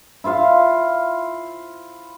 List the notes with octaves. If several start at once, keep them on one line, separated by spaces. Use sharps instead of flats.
E4 F4 C5 F5